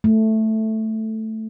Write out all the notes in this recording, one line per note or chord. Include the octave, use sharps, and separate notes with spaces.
A3